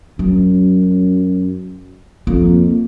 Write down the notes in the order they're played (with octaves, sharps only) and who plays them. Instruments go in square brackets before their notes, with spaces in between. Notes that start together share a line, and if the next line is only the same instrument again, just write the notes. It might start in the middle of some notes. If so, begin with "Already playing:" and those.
[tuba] F#2 [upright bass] F#3
[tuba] F2 [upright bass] A#3